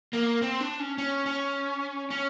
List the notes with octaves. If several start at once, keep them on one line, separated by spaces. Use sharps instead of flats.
A#3
C4
D4
C#4
C#4
C#4
C#4